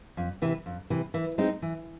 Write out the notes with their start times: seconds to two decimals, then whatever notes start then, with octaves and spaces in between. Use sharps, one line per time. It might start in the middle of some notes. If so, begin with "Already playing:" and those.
0.17 F2
0.42 C3 E3
0.66 F2
0.90 C3 E3
1.14 E3
1.38 G#3 C4 D#4
1.62 E3